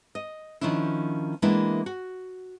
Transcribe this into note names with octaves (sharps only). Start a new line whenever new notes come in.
D#5
D#3 F3 C#4 D4 E4
E3 G#3 A#3 B3 D4 E4
F#4